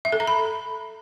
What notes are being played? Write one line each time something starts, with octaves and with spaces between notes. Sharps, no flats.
E5
A4
A#5
B5